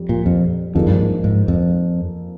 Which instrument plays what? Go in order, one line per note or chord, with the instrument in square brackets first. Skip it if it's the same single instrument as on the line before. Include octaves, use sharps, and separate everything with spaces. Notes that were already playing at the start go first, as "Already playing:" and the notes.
Already playing: [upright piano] F2 G3
[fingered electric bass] A#2
F2
[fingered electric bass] F2 [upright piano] F3 A#3 D#4 G#4
[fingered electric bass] G2
G#2
G#2
F2